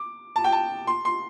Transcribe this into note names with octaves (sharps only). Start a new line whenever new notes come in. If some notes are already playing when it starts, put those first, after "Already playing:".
Already playing: D6
A5
G5
A5
C6
C6